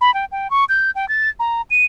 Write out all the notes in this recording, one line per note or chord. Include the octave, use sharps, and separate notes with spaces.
B5
G5
G5
C#6
G6
G5
A6
A#5
D#7